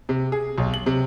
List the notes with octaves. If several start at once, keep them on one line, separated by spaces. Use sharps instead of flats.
C3
G#4
B1
F#7
C3